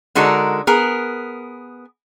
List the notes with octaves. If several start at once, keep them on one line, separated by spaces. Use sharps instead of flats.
D3 G#3 D#4 F#4 A4 A#4
B3 G#4 A#4